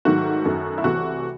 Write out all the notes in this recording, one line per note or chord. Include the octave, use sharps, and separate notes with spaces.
G#2 D#3 F#3 A3 F#4
F#2 D#3 A3
E4
C2 C3 E3 A3 F#4